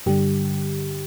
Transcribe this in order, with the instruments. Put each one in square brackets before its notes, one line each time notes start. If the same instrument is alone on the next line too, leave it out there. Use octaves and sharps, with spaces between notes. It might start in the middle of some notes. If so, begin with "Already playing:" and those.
[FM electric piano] G2 D3 G3 G4